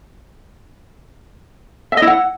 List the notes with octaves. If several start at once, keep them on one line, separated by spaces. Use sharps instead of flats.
E5
D#5
E4
F#5